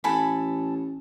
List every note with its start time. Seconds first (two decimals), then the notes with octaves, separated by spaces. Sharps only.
0.04 A1 A4 G#5 B5